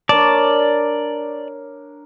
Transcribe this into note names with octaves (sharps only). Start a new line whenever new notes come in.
D4 A#4 C#5 D5 A5